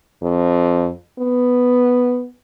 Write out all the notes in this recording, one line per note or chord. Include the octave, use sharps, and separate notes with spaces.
F2
B3